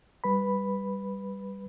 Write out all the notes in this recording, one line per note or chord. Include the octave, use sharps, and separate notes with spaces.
G3 B4 B5